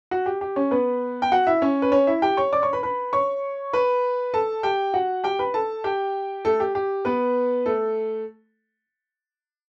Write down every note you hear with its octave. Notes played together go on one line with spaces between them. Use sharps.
F#4
G4
G4
C#4 C#5
B3 B4
G5
F#4 F#5
E4 E5
C#4 C#5
B4
C#4 C#5
E4 E5
G4 G5
C#5 C#6
D5 D6
C#5 C#6
B4 B5
B4 B5
C#5 C#6
B4 B5
A4 A5
G4 G5
F#4 F#5
G4 G5
B4 B5
A4 A5
G4 G5
A3 A4
G4
G4
B3 B4
A3 A4